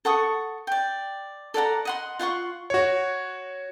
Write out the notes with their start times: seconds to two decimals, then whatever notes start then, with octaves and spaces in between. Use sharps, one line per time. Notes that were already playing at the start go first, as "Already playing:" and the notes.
0.05 A4 F#5 C#6 D#6
0.67 D5 G5
1.54 A4 D5 F#5 A#5
1.85 D#5 F#5 C6
2.19 F4 F#5 C6 C#6
2.70 F#4 C#5